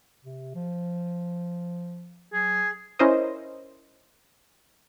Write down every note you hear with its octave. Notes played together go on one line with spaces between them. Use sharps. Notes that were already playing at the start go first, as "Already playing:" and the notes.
C3
F3
F#3 G#4
C#4 E4 A#4 C5 D#5